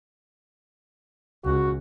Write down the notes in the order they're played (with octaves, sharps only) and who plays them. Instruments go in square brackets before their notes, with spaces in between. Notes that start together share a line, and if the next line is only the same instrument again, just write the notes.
[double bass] C#2 [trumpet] F#4